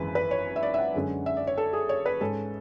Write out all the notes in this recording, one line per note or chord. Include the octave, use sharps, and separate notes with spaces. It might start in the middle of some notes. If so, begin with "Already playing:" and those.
Already playing: G#1 F#2 E3 G#3 B4
B4
C#5
E5
D5
E5
F#5
F#2 D3 G#3 C#4
E5
D5
C#5
A4
G#4
C#5
B4
G#2 G#3 C#4 A4